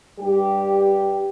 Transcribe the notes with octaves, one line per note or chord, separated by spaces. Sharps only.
G2 G3 G4